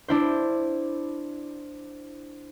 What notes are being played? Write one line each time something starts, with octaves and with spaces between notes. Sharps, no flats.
D4 E4 C5